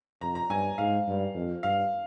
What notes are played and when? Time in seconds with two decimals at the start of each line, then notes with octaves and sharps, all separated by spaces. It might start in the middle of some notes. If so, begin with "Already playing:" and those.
0.21 F2 A#5
0.35 A#5
0.50 G2 G#5
0.78 G#2 F5
1.07 G2
1.35 F2
1.63 G2 F5